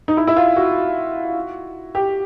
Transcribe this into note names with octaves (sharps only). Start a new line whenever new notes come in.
D#4
E4
E4
F4
F#4
G4